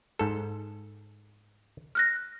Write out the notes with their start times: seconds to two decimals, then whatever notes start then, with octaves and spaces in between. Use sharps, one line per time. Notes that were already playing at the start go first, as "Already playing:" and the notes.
0.19 G#2 A4
1.95 F6 F#6 A#6